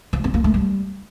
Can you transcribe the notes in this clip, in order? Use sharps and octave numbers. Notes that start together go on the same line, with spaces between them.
F3
C4
A#3
A3
G3